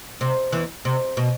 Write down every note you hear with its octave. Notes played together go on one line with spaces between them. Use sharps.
C3
E2 E3
C3
B2